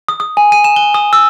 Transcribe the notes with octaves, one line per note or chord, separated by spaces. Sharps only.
D#6
D#6
G#5
D#7
E7
G7
D#6
E6